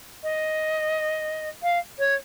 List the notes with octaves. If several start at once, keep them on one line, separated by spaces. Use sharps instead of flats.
D#5
F5
C#5